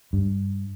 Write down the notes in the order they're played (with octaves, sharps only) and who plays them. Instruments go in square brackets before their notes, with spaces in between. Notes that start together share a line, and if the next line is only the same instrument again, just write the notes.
[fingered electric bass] G2